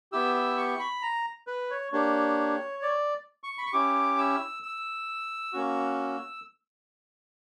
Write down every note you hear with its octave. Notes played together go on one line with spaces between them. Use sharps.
B3 E4 G4 E6
E6
C#6
B5
A#5
B4
C#5
A#3 D4 G4 C#5
D5
C#6
B5
C#6
C#4 E4 G4 D6
E6
E6
A#3 C#4 F#4